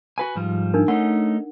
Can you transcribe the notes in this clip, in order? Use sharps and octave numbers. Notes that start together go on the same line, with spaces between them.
F#4 B4 G#5
G#2 F3 G3
D4 D#4 A#4
A3 C#4 D#4 F#5